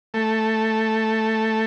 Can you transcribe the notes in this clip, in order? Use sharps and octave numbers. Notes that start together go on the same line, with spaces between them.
A3